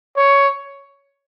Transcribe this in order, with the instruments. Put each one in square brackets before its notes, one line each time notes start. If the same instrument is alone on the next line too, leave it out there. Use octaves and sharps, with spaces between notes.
[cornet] C#5